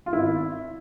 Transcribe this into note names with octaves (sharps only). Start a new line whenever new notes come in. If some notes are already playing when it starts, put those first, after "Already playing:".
F4
G#1 E4